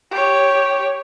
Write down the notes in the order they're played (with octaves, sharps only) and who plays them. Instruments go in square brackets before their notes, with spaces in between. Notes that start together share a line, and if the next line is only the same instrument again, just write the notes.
[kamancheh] G4 C#5